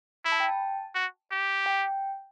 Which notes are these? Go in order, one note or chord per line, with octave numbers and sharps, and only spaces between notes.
E4 B5
A5
G5
A5
F#4
G4
G5